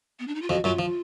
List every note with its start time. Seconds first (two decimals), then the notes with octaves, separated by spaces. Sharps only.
0.19 B3
0.28 D4
0.35 D#4
0.42 F4
0.49 F2 F3 F#4
0.64 F#2 F#3 F4
0.79 F3